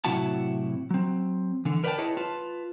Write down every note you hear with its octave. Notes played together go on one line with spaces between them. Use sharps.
A2 C3 F#3 E4 F#4 A5
F#3 C4
D3 E3
A#4 B4 D5 E5 G5 A5
E4 G#4 B4 C#5 D#5 A5
F4 B4 A5